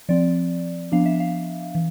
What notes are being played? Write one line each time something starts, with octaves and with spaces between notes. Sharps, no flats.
F3 C4 D5
F3 B3 D4 F5
E5
F5
E3